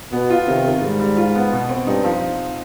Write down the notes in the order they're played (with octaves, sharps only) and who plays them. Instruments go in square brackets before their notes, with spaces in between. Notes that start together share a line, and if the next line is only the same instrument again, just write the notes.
[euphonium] B2 [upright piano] B3
[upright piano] F4
[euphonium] C3 [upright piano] D#3
[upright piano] D#3
[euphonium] G#2 [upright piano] G3
[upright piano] G3
F4
B3
B2
C4
[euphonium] G2 [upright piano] D#4
[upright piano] F3